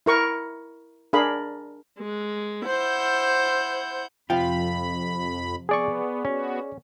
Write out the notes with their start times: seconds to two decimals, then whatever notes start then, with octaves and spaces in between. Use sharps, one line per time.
0.06 E4 A#4 C#6
1.13 D4 G#4 A#4 F5 B5
1.97 G#3
2.66 E4 C5 F#5 G6
4.30 F2 C3 F3 F4 F5 G5 B5
5.69 B3 G#4 D5 C#6
6.25 B3 C#4 F#4